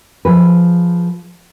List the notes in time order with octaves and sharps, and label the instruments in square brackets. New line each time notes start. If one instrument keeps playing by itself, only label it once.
[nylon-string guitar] F3 G#4 B4